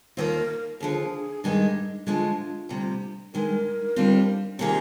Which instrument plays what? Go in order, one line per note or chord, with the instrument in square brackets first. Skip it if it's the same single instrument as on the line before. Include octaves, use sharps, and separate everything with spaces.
[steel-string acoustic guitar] D#2 D#3 A#3 F4 [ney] A#4 C5
[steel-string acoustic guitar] D#2 D3 F3 [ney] G#4
[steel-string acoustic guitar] G2 D#3 G#3 D#4 G4
[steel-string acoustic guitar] D2 D3 F3 G#3 [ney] F4
[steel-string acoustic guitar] D2 C3 G3
[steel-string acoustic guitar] G2 D#3 G#3 [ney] A#4
[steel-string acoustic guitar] D#2 D3 G3 C4 F4
[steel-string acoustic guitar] C3 D#3 A#3 F4 G#4 [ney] G4